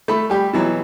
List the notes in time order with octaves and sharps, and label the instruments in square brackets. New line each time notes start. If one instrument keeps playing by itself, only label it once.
[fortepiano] A3 B5
G3 G4
B2 E3 F#3